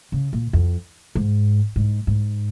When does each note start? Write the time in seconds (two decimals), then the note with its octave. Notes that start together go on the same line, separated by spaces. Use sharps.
0.12 C#3
0.33 A#2
0.53 F2
1.15 G#2
1.76 G#2
2.07 G#2